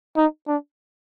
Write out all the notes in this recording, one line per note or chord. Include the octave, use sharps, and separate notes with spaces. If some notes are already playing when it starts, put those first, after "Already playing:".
D#4
D4